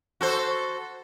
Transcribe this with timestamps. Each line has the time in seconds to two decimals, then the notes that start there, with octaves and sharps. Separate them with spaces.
0.21 F#4 A4 C5